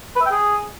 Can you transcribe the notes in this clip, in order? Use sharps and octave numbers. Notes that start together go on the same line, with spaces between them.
B4
E5
G5
G#4